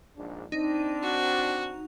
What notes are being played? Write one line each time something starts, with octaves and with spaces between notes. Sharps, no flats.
A#1 G#2 D4
C4 D4 D#4
F#4